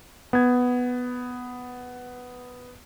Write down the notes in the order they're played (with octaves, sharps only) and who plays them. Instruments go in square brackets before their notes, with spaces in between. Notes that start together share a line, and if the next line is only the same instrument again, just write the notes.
[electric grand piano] B3 G#6